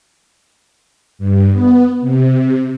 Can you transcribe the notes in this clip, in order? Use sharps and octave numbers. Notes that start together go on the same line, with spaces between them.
G2
B3
C3